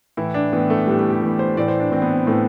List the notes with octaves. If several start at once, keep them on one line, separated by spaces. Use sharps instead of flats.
A2 E3 E4
D4
A2 E3 B3
A3
A2 E3 G3
A3
G4
A2 E3
C5
A2 E3 D5
C5
D4
A2 E3 C4
B3
C4
A2 E3 A3